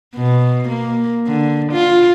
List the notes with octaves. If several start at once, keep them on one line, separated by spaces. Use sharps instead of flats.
B2
A#3
D3
F4